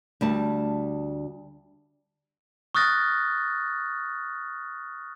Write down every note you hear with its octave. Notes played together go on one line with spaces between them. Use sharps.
D2 G3 A5
C#6 D#6 F6 F#6 A6 A#6